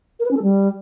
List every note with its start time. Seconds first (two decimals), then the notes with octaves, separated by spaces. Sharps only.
0.19 A#4
0.25 B4
0.31 C#4
0.37 A4
0.42 G3